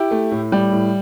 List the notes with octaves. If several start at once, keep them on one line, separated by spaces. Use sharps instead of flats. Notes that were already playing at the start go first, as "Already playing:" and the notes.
Already playing: E4 G4
A3
A2
G3
A2